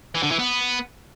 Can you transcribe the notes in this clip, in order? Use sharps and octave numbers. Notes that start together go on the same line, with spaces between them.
E3
D3
E3
B3